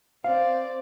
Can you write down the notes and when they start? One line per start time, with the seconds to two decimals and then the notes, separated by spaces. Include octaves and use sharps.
0.24 C4 D5 F5